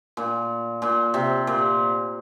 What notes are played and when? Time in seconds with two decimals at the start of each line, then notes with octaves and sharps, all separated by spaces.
0.17 A#2
0.82 A#2
1.14 C3
1.47 A#2